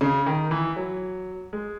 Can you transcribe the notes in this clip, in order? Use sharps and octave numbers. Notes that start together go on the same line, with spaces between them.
C#3
D#3
E3
F#3
G#3